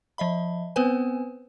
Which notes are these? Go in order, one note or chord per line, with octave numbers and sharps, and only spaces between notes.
F3 D#5 E5 B5
B3 C4 B4 C5 G#5